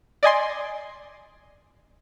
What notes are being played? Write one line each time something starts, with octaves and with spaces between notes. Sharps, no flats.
D5 D#5 G#5 C6